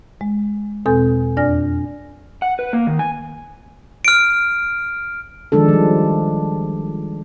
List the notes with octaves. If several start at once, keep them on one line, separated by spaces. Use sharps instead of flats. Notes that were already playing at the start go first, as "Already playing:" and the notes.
G#3
E2 B2 C4 A4 G#5 G6
F2 D4 D5 G#5 F6 A#6
F#5
B4
A#3
D#3
G#5
F6 D7
D#3 F3 G#3 D4 A4
F3 G3